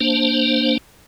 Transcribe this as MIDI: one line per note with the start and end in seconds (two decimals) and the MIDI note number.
0.01 0.78 58
0.01 0.78 62
0.01 0.78 72